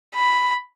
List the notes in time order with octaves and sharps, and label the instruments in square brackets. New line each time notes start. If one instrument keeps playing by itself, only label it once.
[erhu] B5